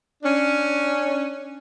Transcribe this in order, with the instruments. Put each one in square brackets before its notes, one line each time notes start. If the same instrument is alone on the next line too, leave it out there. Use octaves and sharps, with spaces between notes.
[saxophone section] C#4 D4